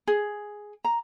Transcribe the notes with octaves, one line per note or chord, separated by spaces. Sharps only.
G#4
A#5